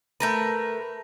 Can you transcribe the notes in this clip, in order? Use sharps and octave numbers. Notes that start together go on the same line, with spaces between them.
A3 A#4 B4